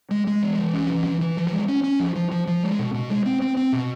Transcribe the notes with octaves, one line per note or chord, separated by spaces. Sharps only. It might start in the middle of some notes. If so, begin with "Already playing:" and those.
G#3
G#3
E3
E3
C#4
E3
E3
E3
F3
G#3
C#4
C#4
F3
F3
F3
F3
G#3
B2
B2
G#3
C4
C4
C4
B2